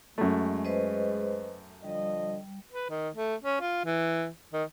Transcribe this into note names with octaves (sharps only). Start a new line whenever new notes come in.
F#2 G#3 A3
B4 C5 D#5
D3 F3 G3 D#5
B4
D#3
A3
C#4
F4
E3
D#3